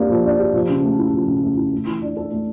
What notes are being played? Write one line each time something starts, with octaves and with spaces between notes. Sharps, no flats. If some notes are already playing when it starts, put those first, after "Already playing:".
Already playing: A#3 D4 G4
F3
D4
G4
F3
C#3
A3
E4
F3
C#3
A3
E4
A3
E3
D4
A4
A3